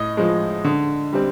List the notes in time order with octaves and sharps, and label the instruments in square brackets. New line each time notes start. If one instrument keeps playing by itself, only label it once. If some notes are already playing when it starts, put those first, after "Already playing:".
Already playing: [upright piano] A2 D#5
F3 G#3
D3
G3 C4